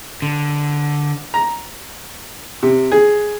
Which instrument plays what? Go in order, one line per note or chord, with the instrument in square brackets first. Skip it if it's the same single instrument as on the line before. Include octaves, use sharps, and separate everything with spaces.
[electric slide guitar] D3
[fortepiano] A#5
C3
G#4